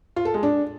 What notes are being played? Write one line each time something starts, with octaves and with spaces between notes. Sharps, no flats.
F4
A4
G#3
D4